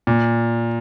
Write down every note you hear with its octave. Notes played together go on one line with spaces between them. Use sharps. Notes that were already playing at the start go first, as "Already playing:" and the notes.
A#2